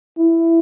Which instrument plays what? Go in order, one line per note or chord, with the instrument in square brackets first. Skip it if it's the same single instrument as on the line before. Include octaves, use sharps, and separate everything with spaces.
[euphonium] E4